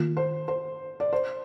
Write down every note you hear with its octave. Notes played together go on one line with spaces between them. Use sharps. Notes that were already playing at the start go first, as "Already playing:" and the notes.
Already playing: D#3 A#3 F4
C5
C5
D5
C5